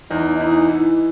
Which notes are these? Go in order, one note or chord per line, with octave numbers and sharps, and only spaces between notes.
E2 D#4
E3 D#4
E3